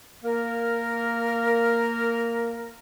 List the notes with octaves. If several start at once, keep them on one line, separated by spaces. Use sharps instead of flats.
A#3 A#4